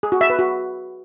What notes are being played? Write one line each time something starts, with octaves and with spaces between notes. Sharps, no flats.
G#4
F#4
E5
B4
F#4